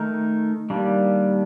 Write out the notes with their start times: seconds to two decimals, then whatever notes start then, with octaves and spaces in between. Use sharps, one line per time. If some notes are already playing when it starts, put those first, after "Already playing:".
Already playing: D#3 A3 D#4 A#4
0.70 D#3 G3 A#3 D4